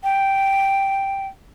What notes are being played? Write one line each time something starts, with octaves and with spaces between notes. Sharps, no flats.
G5